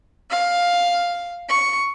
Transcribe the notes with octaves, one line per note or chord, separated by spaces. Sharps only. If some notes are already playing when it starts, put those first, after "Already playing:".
F5
C#6